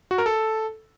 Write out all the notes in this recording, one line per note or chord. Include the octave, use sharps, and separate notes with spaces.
F#4
A#4
A4